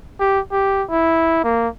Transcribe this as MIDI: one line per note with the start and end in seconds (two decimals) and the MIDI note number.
0.20 0.40 67
0.52 0.84 67
0.90 1.43 64
1.44 1.68 58